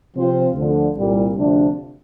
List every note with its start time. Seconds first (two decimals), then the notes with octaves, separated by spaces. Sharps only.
0.15 C3 F3 C4 F4 C5
0.54 D2 D3 F3
0.95 C2 A#2 G3
1.35 D2 C3 F3 D4